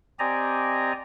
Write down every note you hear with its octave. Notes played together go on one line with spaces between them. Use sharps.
C4 G4 D5 D#5 G#5 A#5